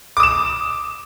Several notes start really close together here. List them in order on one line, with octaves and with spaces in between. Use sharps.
D6 D#6 E7